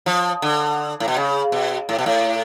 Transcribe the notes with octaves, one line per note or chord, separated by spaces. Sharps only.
F3
D3
A2
B2
C#3
B2
A2
B2
A2